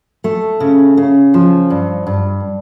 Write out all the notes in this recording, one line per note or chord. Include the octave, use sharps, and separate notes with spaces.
A3
C#3
C#3
F3
G2
G2